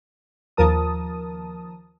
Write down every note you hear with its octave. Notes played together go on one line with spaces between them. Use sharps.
D#2 F3 A#4 A5 D#6